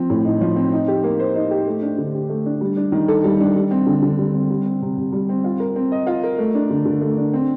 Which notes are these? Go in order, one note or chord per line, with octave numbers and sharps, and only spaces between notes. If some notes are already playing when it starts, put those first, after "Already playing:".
Already playing: F3 C4
A2
D#4
F3
C4
D#4
G4
A#3
C5
D#4
G4
A3
D4
D3
G4
A3
D4
G3
D4
D#3
A4
G3
D4
G3
C4
D3
D3
G3
C4
G3
C4
C3
C3
G3
C4
F4
A#4
C4
D#5
F4
A#4
A3
D4
D3
D3
A3
D4
C4